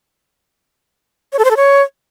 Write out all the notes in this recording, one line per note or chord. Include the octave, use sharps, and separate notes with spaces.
C#5
A4
C5
A4
C#5